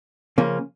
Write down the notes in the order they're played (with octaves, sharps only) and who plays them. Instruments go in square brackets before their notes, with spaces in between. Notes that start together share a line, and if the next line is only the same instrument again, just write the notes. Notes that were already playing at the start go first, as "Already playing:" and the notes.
[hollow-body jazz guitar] C#3 F3 A#3 C#4 F4